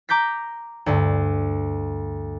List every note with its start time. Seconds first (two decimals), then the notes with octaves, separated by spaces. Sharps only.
0.09 A#5 D6 G6 A#6 B6
0.86 D2 G2